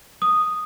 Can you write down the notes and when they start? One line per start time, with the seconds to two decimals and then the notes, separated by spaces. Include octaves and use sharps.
0.22 D#6